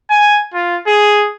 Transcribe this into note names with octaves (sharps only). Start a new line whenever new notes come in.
G#5
F4
G#4